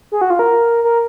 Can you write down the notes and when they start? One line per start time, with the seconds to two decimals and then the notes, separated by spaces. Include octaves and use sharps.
0.12 G#4
0.21 F#4
0.30 F4
0.39 A#4
0.84 A#4